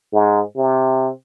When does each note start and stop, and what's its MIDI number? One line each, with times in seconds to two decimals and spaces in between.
0.13 0.42 44
0.56 1.09 48